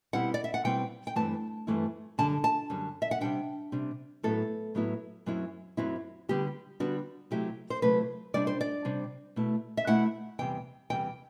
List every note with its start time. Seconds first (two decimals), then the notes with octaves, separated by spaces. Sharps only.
0.13 B2 G3 C4 E4 F#5
0.34 D5
0.44 E5
0.54 F#5
0.65 B2 G3 C4 E4 G5
1.07 G5
1.16 G2 E3 A3 C4 E4 A5
1.67 G2 E3 A3 C4 E4
2.18 F#2 D3 G3 A5
2.44 A5
2.70 F#2 D3 G3
3.02 E5
3.11 F#5
3.21 C3 G3 D4 G5
3.72 C3 G3 D4
4.23 A2 F#3 B3 E4 A4
4.75 A2 F#3 B3 E4
5.26 F#2 F#3 C4 E4
5.77 F#2 F#3 C4 E4
6.29 D3 G3 B3 D4 G4
6.80 D3 G3 B3 D4 F#4
7.31 C3 F#3 A3 E4 G4
7.70 C5
7.82 C3 F#3 A3 E4 B4
8.34 C3 G3 D4 D5
8.47 C5
8.61 D5
8.85 C3 G3 D4
9.36 B2 A3 E4
9.77 E5
9.87 B2 A3 E4 F#5
10.39 E2 C3 G3 G5
10.90 E2 C3 G3 G5